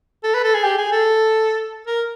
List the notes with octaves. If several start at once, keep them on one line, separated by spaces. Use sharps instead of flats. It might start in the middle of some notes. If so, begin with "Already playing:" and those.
A4
B4
A4
G#4
G4
G#4
A4
A#4